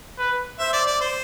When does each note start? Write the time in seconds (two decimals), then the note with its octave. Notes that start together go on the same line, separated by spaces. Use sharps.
0.18 B4
0.59 C5 E5
0.73 D5
0.87 D5
1.01 C5